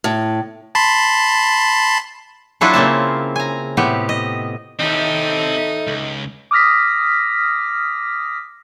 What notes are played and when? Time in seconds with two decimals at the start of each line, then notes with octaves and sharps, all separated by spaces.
0.04 A2
0.75 A5 B5 C6
2.61 F#3 D4 E4 F4 A4 B4
2.73 C#3 A#3 C4 A5
3.36 G#5 A#5
3.77 A2 C3 B3 G4
4.09 D#5
4.79 D#2 A2 A3 C4 D#4 G4
5.87 C#2
6.51 D6 D#6 F6 A#6 B6